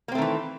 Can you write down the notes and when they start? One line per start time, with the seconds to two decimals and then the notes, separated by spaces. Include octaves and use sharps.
0.08 A#3
0.12 C4
0.15 A3
0.18 D#3
0.22 E3